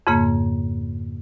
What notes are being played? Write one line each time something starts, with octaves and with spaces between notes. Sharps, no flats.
F2 G#2 C#3 A#3